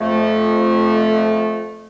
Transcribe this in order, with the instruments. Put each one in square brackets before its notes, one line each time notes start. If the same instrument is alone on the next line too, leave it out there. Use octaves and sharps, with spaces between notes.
[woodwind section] F2 A3